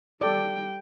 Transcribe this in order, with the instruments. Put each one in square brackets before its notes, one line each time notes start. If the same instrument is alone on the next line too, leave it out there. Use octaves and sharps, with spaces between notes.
[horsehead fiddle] G3 G5 [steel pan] A4 D5